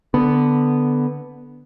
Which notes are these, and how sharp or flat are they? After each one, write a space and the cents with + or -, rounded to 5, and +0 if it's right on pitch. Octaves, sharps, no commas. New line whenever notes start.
D3 +0 B3 +0